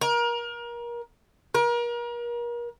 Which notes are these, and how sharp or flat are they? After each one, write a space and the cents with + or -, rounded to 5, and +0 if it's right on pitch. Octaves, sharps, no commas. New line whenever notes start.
A#4 +30
A#4 +35